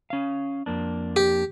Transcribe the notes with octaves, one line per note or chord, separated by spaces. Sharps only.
C#4 F5
F2 A#3 D4
G4